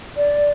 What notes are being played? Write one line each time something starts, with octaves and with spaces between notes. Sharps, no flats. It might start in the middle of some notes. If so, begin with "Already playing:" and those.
D5